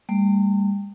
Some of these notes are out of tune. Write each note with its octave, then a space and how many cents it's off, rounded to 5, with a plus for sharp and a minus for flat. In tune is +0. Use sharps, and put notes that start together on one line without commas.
G3 +25 A#3 -45